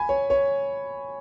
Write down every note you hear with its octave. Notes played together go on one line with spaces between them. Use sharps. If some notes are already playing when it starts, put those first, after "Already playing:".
Already playing: G#5 B5
C#5
C#5